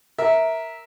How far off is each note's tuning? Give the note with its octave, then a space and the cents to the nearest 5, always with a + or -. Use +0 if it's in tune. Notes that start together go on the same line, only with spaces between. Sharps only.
A#4 +0 E5 -15